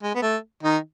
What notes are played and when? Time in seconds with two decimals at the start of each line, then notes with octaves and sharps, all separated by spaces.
0.03 G#3
0.15 B3
0.22 A3
0.63 D#3 D#4